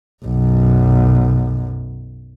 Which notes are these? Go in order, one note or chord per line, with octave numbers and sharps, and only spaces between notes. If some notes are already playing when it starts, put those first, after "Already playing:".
B1 F#2